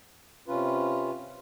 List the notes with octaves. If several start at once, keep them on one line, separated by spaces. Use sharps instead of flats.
C3 C#4 F4 B4